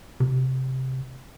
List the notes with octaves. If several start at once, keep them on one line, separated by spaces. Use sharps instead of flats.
C3